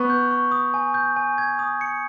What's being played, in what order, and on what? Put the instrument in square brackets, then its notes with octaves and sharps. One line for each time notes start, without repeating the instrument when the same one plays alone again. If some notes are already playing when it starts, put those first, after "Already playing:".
Already playing: [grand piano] B3 [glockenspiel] C#6
[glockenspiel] G6
C#6
D#6
G#5
G6
G#5
G#6
D#6
C#7